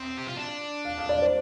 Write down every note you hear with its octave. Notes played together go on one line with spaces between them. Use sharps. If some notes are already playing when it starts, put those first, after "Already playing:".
Already playing: C4
G4
F4
D4
F5
F5
D5
C5